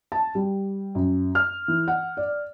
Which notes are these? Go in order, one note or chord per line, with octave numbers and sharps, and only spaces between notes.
A5
G3
F#2
F6
E3
F#5
D5